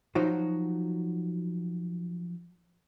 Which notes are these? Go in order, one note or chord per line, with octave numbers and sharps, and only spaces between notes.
F3 F#3 D#4 F#4